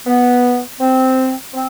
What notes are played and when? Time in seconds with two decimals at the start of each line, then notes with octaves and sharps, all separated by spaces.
0.07 B3
0.80 C4
1.54 C4